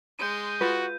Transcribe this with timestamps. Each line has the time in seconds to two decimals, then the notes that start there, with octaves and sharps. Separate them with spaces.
0.19 G#3 C6 G6 D#7
0.61 F4 F#4 B4